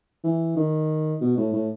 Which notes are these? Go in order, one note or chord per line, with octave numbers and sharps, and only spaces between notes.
E3
D#3
B2
A2
A2